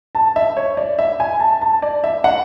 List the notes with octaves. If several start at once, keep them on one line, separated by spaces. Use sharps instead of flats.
A5
E5
C#5
D5
E5
G#5
A5
A5
D5
E5
F#5